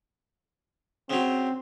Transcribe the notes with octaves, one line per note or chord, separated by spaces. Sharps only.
C#3 F#3 C4